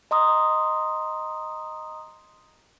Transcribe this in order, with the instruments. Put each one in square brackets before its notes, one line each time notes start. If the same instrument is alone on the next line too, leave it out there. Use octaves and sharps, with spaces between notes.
[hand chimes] D#5 A#5 C6 D#6